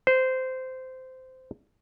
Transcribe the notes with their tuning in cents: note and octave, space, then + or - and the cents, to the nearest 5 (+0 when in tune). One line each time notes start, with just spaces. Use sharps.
C5 -15